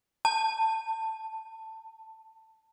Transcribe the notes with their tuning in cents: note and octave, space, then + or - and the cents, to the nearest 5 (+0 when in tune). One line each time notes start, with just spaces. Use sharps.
A5 +15